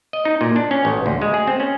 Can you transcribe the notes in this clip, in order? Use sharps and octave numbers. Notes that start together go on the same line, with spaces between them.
D#5
D#4
A#2
D4
C#4
A1
D2
G#3
G#4
C4
C#4